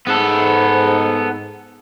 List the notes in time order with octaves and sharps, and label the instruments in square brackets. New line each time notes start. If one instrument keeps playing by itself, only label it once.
[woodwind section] G#2 [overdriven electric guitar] B3 A4